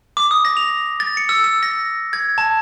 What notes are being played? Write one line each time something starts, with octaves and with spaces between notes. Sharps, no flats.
D6
D#6
A#6
F7
A6
C#7
E6
E6
A#6
G#6
A5